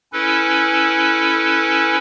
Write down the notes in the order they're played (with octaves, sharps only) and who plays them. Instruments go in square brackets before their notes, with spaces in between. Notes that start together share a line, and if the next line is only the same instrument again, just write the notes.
[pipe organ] C#4 E4 A4 B4